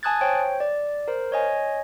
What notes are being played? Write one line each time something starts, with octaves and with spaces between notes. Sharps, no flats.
G#5 A5 D#6 F#6 G#6 A6
C5 C#5 G5
D5
A#4 C5
C#5 D#5 G#5